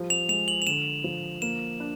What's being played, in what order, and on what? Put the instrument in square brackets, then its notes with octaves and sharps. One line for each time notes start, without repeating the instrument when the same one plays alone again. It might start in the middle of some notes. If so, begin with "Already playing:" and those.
Already playing: [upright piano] F3 G3
[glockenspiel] F7
[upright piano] G#3 [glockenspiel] F7
[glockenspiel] F#7
F7
[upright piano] D3 [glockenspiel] E7
[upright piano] F3
[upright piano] A#3 [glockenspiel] E7
[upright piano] D4